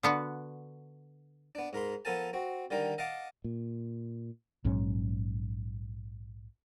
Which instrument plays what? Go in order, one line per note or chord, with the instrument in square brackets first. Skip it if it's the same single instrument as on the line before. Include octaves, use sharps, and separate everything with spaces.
[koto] D3 B3 F#4
[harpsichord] B3 D4
G#2 A#4 B5 C6
F3 B3 A4 A#4 G#5 A5
C4 F#4
D3 D#3 G3 A#4
D#5 F5 F#5 A5 D6
[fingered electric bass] A#2
[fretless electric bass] A#1 G#2 F#3 C#4